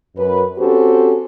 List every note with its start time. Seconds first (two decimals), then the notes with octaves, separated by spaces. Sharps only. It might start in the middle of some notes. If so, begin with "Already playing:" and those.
0.17 F#2 B4
0.59 C4 C#4 F#4 G4 A4 C5